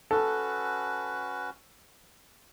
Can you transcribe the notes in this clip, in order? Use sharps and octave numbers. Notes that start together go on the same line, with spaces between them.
C#4 F#4 A4 B4